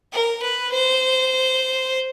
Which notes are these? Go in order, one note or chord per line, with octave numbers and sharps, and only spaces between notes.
A#4
B4
C5